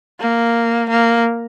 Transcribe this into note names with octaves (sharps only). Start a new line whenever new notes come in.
A#3
A#3